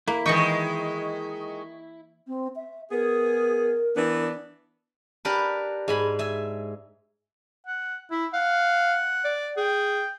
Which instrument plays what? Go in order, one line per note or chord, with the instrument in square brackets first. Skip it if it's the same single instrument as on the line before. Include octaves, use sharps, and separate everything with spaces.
[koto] A#3 [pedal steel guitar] E4
[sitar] D#3 G#3 [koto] E3 G5 [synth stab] D#5 C#6
[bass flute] C4
E5
[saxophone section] B3 G#4 [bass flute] A#4
[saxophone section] E3 B3 D4
[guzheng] D4 G4 A#4 B4
G#2 G#5 B5
E5 G#5
[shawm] F#5
[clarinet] E4 [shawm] E5
[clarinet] F5 [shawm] F#5
[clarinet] D5
[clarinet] G#4 [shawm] G5